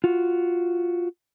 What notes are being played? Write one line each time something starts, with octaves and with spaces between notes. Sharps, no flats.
F4 F#4